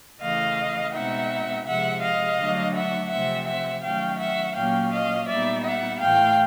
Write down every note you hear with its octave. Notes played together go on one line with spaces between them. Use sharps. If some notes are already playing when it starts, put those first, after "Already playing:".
C#3 E3 A3 D#5 F5
B2 G#3 C4 D#4 E5 F#5
C3 F3 G#3 E5 F#5
D#5 F5
D3 F#3 A3 D4
E5 F#5
C3 F3 A3 C4 E5 F#5
E5 F#5
D#3 F#3 A3 C#4 F5 G5
E5 F#5
A#2 F#3 A#3 C#4 F5 G5
D#5 F5
A#2 G3 B3 D#4 D5 E5
E5 F#5
A2 E3 A3 F5 G5